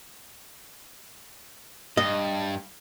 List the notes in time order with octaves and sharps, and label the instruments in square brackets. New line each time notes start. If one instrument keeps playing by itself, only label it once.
[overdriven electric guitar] G2 [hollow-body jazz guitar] D#5